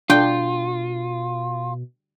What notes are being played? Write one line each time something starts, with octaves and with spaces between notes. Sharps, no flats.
B2 D4 F4 G5